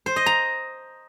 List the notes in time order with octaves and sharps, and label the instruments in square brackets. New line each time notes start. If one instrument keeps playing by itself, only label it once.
[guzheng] C5
D#5
A#5